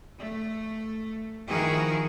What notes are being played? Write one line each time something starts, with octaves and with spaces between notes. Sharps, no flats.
A3
D#3 F3 E4 F#4 G#4 A#4